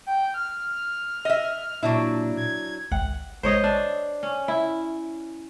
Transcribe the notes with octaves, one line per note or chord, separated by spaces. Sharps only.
G5
F6
D#5 E5
A#2 F#3 D4 E4
G#6
G#1 C#2 F#5 G5
A#1 G#3 C5 C#5 D#5
D4 F6
C#4
E4